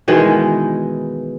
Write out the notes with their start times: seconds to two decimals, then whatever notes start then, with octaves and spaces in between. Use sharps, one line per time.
0.08 B2 D#3 E3 G#3